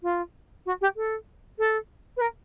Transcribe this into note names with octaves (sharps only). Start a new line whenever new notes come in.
F4
F#4
G4
A4
A4
B4
A#4